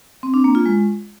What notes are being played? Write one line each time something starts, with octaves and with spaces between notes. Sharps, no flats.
C4
D4
A#3
F4
G#3